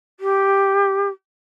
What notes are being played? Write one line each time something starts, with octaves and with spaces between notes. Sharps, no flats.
G4